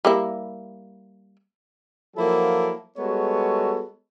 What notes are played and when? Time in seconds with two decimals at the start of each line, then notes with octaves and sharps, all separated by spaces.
0.05 G3 A#3 E4
2.17 F3 F#3 A#3 E4 F4 A4
2.98 G3 G#3 B3 F#4 A4 C#5